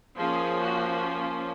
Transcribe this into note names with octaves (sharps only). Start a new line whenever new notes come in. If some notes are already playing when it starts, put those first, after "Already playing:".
F3 A#3 C#4 G#4
F#4